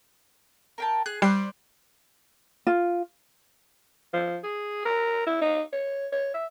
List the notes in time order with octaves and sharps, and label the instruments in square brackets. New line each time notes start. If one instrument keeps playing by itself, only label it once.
[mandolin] A#4 G5 A5
[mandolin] G#4 [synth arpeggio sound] F#6
[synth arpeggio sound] G3 C7 [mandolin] C5 D5 F#6
[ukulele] F4
[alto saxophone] F3
G#4
A#4
E4
D#4
C#5
C#5
E5